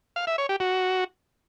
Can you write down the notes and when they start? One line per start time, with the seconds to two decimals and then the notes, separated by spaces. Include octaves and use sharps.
0.16 F5
0.27 E5
0.38 C#5
0.49 G4
0.60 F#4